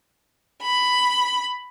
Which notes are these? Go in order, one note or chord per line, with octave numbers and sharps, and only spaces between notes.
B5